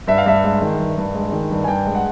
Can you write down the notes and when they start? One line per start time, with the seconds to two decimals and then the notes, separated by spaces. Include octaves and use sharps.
0.08 G2 E5
0.18 F5
0.26 G2 E5
0.44 G#3
0.62 D#3
0.79 G2
0.98 G2
1.15 G#3
1.32 D#3
1.51 G2
1.64 G#5
1.68 G2 G5
1.87 G#3
1.95 F#5